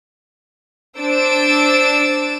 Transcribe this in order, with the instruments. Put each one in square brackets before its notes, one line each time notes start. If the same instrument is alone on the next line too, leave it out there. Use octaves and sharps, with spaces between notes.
[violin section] D4 C5 E6 A6 D7